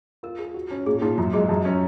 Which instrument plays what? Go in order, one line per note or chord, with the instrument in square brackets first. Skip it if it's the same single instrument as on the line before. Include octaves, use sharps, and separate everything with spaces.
[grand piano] F4 [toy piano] A#4
[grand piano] G#4
F#4
C#4
[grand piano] A#2 [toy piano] G#4
[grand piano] A#2 [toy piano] D#4
[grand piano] F#2 [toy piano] F4
[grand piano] G#3 [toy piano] G#4
[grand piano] F#2
C#4